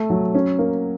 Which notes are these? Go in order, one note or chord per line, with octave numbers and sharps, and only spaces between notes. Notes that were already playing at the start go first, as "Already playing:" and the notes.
Already playing: A3
F#3
C#4
A#3